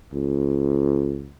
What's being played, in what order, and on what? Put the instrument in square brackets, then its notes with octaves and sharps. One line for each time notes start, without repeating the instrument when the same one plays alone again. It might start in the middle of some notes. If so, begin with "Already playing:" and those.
[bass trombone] C#2